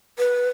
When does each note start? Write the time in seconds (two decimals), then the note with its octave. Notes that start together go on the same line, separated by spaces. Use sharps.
0.19 B4